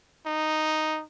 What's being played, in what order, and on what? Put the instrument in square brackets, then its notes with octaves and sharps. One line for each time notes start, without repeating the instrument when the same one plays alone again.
[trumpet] D#4